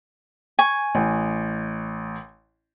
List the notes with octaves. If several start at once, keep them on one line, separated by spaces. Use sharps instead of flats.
G#5 C#6
A1